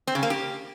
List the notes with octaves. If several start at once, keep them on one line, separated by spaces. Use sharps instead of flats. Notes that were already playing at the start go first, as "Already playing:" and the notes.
C4
C#3
A#3
G4